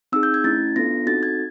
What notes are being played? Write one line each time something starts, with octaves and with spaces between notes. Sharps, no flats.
C4 D#4 G#4 E6
G6
G#6
A3 C#4 E4 A6
B3 D4 F4 A4 A#6
C4 D#4 F#4 A4 A6
G#6